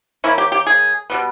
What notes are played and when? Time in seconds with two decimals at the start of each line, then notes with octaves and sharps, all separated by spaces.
0.24 D#3 A#3 C#4 E4
0.38 G4
0.52 G4
0.67 G#4
1.10 B2 G3 B3